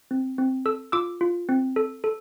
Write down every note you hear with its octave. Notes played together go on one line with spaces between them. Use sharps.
C4
C4
A4 E6
F4 D6 E6
F4
C4
A4
A4